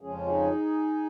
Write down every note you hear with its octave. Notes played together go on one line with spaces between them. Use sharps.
F2 C#3 F3 G#3 C#4 G#4
F4
D#4 G#4